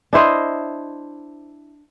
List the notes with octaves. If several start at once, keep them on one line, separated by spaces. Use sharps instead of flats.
D4 E4 C5 D#5